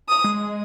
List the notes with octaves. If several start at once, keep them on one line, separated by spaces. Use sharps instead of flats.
D#6
G#3